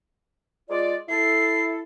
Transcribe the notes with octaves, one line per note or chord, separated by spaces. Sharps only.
G#3 F4 D5
E4 A4 C7